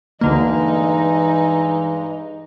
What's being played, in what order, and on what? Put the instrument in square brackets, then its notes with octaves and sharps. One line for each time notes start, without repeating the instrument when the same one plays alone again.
[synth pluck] D2 D3 A#3 [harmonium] G2 G#3 [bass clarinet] E3 [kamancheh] D#4